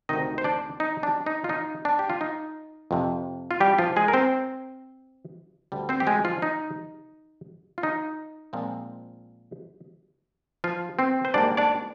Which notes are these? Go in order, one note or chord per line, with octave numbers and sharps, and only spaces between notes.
D2 C3 D#3 D#4 D#5
C5
D4 D5
D#4
D4
D#4
F4
D#4
D4
G4
F4
D#4
F2 C3 F3
F4
G3 G4
F3 F4
G#3 G#4
A#4
C4 C5
D2 D3 G3
C4 C5
G4
G#3 G#4
F3 F4
D#4
F4
D#4
A#2 F3 G#3 C4
F3 F4
C4 C5
C5
G#2 G3 A#3 D4 D5
D4 D5